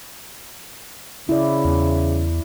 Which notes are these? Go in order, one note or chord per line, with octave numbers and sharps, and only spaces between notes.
C#3 E4 D5
E2